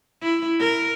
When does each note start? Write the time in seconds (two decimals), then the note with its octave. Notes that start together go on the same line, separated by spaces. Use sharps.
0.22 E4
0.60 A#4